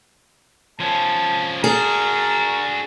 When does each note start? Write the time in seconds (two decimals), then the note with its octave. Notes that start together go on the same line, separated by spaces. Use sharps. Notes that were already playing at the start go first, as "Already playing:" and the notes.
0.80 F3 C#4 A5
1.64 D4 F#4 G#4 A#4